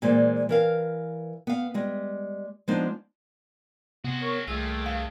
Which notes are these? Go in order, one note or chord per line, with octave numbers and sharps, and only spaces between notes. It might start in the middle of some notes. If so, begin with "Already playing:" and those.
A#2 E3 G#3 C5 D5
E3 A#4 F5
B3 F5
G3 G#3
F3 G#3 B3 D4 D#4 C5
C3 B3 F#4 G#4
A#4 C#5
C2 D#3 A3 A#3 F4 G#4 E6
G2 F5